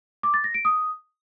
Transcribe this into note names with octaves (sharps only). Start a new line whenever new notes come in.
D6
A6
A#6
D7
D#6